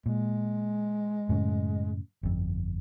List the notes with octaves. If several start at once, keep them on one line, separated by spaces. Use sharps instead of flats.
A#2 G#3
F#2 A2 C#3
G1 F2